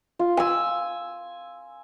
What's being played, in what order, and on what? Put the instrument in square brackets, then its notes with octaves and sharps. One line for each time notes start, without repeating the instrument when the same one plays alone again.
[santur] F4
G#5 E6